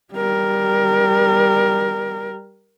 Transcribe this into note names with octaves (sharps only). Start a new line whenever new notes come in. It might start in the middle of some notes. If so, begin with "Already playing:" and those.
G3 A#4